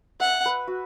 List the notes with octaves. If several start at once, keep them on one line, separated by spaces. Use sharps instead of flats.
E5 F#5
B4
F#4